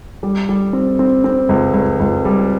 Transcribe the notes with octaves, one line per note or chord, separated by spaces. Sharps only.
G3
G3
C4
C4
C4
C#2
C#2
C#2
G3